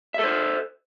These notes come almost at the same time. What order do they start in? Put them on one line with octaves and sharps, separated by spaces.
E5 A4 C5